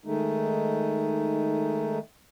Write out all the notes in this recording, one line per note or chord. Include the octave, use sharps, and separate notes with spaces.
D#3 G#3 A3 D#4